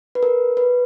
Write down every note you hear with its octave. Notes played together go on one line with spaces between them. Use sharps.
B4
A#4
B4